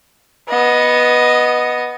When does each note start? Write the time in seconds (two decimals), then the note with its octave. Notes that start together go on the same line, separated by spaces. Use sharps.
0.49 B3 D#5